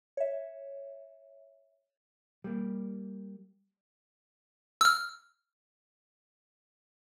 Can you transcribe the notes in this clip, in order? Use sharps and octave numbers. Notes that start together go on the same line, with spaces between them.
C#5 E5
G3 A#3
E6 F6